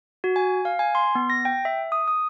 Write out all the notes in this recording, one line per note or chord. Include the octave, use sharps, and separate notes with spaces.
F#4
G#5
F5
G#5
C6
B3
A#6
G5
E5
D#6
D#6